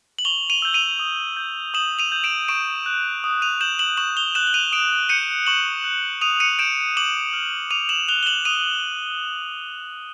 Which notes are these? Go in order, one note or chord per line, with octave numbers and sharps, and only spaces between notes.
F#7
C#6 F7 G7
D#7 F7
E6 G6
D#7 F7
D#6
G6
D#6 E7 F#7
D#7 F7
G6
D7 E7
C#6 D7 E7
F#6
D#6
D#7 F7
G6 E7 F#7
E7 F#7
C#6 E7 F#7
F7 G7
F#6 E7 F#7
F#7
D#7 F7
D#6 D7 E7
G6 C#7 D#7
C#6 E7 F#7
F#6
D#6 D#7 F7
C#7 D#7
G6 D7 E7
D6 E7 F#7
F6
D6 D#7 F7
E7 F#7
F#6 F7 G7
G7
E7 F#7
D#6 D#7 F7